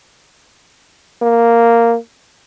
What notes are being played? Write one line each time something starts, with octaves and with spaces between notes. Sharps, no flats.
A#3